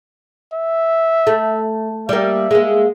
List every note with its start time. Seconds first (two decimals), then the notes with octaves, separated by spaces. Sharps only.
0.54 E5
1.27 A3
2.09 G3 A#3 E5
2.51 G#3 A#3